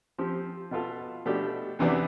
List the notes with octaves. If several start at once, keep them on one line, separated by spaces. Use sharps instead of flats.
F3 C4 G4
B2 B3 F4 A4
B2 A3 D4 G4
E2 C3 E3 B3 D4